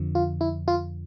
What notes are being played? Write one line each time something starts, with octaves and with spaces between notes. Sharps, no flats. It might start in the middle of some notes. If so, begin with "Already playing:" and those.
Already playing: F2 D3 F3
F4
E4
F4